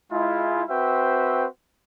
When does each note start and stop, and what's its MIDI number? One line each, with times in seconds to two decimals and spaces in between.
0.11 0.63 56
0.11 0.63 64
0.11 0.63 65
0.69 1.47 60
0.69 1.47 66
0.69 1.47 71
0.69 1.47 72
0.69 1.47 76
0.69 1.47 79